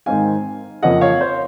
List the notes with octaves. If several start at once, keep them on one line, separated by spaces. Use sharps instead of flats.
G#2 D#3 G#3 C4 D#4 F5 G#5
F2 C#3 F3 A#3 D#5 F#5
C#5 F5
C5